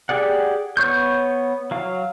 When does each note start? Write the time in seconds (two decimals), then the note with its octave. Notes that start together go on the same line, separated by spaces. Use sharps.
0.09 G4 G#4 D5 F#5
0.77 B3 C#5 C#6 G6
1.71 F#3 F5